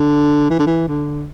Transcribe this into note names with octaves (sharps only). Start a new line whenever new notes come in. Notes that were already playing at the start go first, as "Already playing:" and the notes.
Already playing: D3
E3
D3
E3
D3